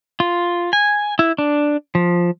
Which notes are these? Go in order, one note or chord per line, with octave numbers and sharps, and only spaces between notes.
F4
G#5
E4
D4
F3